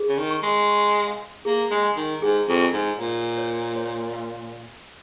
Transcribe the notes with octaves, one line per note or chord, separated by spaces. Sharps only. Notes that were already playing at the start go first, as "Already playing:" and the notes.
Already playing: G#4
C#3
D#3
C#6
G#3
C#6
F5
A#3 G#4
G#3
G#5
D#3
G#2 G#4
F2
G#5
G#2
A#2 C#5
C#5
C#5
F5